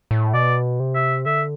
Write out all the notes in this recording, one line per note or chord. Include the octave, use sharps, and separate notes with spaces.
A2
B2 D5
C3
E5
D3 E5